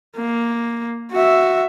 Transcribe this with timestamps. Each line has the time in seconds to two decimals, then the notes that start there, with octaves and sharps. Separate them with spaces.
0.17 A#3
1.12 F#4 E5